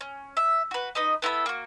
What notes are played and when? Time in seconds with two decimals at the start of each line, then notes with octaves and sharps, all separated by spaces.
0.01 C#4
0.37 E5
0.71 F#4 B4
0.95 D#4 B4 D#5
1.22 B3 E4 A4 B5
1.46 A#3 F#4